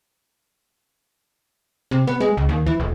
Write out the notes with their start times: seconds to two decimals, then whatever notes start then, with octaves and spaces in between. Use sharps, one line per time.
1.91 C3
2.07 B3
2.20 G#3
2.37 C#2
2.49 D#2
2.66 E3
2.80 D#1